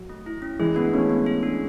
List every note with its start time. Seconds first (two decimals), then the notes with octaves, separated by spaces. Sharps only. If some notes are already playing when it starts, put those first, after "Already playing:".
Already playing: F#3
0.10 A3
0.26 E4
0.42 C#4
0.59 E3 G#3 G#4
0.76 G#3 B3 D4
0.93 A3 B3 C#4
1.09 B3
1.26 G#4
1.43 D4